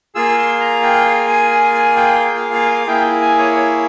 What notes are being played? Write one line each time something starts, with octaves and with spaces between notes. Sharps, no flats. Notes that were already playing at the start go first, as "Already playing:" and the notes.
A#3 F4 G#4 E6
C6
A#5
G5
F5
G#5
G#5
G#5
G5
G5
F5
F5
F5
A#3 E4 G#4 G5
G#5
C#5
C#5